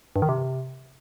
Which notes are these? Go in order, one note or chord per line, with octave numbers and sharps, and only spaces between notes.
G2
D#3
C3